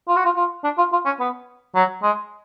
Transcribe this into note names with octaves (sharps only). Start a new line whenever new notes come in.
F4
F#4
F4
F4
D4
F4
F4
C#4
B3
F#3
G#3